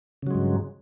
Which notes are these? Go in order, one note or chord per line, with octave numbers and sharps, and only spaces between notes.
G2 C#3 F#3 G#3